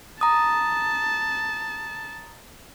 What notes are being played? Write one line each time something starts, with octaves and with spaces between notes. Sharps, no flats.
A5 A#5 D#6